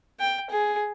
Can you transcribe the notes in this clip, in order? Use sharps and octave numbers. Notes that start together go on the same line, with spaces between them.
G5
G#4